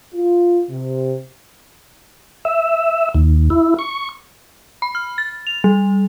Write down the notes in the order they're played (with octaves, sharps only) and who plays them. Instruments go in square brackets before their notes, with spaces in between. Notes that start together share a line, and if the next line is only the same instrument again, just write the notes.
[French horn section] F4
C3
[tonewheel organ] E5
D#2
E4
C#6
[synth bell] B5
F6
A6
F7
G3